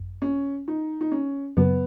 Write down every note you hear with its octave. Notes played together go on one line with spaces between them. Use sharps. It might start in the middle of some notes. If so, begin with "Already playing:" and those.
Already playing: G#1 F#2
C#4
D#4
D#4
C#4
F#2 C#3 F#3 B3